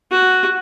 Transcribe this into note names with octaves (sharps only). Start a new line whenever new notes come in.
F#4